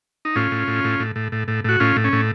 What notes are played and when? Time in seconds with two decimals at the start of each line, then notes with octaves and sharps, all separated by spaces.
0.25 D#4
0.36 A2 C#4 F4
0.52 A2
0.68 A2
0.84 A2
1.00 A2
1.16 A2
1.32 A2
1.48 A2
1.64 A2 F#4
1.80 A2 C#4 F4
1.96 A2
2.04 C#4
2.13 A2